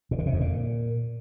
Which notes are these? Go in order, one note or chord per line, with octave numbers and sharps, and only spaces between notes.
A#2
D3
C3
F2
A#2